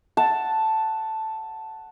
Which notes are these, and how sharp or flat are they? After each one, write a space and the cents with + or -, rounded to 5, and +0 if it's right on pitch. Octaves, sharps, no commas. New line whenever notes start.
F#5 +0 A5 +0 E6 +0